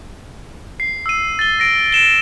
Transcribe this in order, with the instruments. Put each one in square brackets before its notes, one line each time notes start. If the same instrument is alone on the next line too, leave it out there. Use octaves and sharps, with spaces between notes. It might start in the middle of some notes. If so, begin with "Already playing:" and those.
[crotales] C7
E6 D#7
A6 G7
A#6 D7
D7 E7 G7